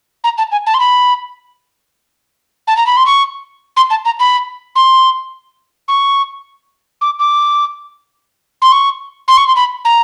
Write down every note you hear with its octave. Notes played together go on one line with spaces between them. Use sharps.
A#5
A5
G#5
A5
C6
B5
A5
A#5
B5
C6
C#6
C6
A5
A#5
B5
C6
C#6
D6
D6
C6
C#6
C6
C#6
C6
B5
A#5